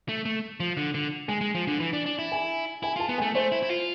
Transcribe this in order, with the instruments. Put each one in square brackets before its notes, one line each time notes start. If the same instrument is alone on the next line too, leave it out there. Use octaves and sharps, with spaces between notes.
[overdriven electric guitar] A3
A3
F3
D3
D3
[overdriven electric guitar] G#3 [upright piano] G#5
[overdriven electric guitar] G#3
F3
D3
E3
D4
D4
E4
[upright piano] G#5
[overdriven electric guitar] E4 [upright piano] G#5
[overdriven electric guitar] F4 [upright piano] A5
[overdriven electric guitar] B3
[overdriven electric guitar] A3 [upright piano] G#5
[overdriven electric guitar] A3 [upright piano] C5
[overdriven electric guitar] E4
E4
F4